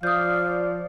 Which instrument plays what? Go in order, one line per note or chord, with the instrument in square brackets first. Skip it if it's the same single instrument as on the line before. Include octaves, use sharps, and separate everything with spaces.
[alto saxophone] F3 [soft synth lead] D5 [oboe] F5 [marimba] D#6 G6